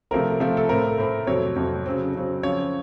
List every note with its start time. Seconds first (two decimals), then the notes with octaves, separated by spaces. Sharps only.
0.11 C3 F3 A3 C4 A#4
0.40 C3 F3 A3 C4
0.57 A4
0.69 A2 A3 C4 A#4
0.98 A2 A3 C4
1.27 F2 C3 F#3 C4 C#5
1.56 F2 C3 F#3 C4
1.86 C#3 F#3 C4
2.15 C#3 F#3 C4
2.43 C#3 F3 C4 C#5